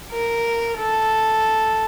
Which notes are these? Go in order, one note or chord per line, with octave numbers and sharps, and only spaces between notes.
A#4
A4